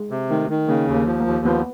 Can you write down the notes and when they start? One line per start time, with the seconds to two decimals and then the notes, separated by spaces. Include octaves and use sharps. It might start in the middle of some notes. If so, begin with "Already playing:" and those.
Already playing: G#3
0.11 C3
0.30 D#3 A3
0.50 D#3
0.68 C#3 A#3
0.88 D#2
0.94 A#3
1.06 F3
1.20 A#3
1.26 D#2
1.45 F3 B3